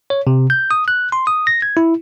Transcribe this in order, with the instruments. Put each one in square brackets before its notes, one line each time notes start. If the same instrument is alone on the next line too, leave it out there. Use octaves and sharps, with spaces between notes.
[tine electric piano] C#5
C3
G6
D#6
F#6
C6
D#6
A#6
G#6
E4